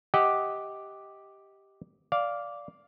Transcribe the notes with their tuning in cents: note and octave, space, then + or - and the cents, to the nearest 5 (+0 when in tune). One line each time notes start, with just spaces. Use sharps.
G4 +0 D#5 +20 F#5 +0
D5 -10 F5 +0